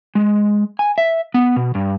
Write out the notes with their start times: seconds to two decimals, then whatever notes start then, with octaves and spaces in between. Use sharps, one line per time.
0.15 G#3
0.79 G#5
0.98 E5
1.34 B3
1.56 B2
1.75 G2